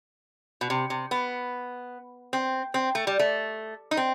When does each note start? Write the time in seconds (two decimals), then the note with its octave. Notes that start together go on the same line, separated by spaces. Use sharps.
0.61 B2
0.70 C3
0.90 C3
1.11 B3
2.33 C4
2.74 C4
2.95 A3
3.07 G3
3.19 A3
3.91 D#4
3.97 C4